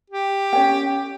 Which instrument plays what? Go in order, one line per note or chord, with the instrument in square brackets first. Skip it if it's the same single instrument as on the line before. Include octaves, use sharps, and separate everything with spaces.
[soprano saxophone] G4
[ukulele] C#4 C#5 G5